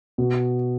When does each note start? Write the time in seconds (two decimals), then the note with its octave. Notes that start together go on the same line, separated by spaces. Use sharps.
0.18 B2